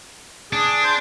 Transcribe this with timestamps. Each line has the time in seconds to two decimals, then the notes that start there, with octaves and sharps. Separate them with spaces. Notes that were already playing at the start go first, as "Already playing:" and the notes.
0.53 D4 G#4
0.84 C5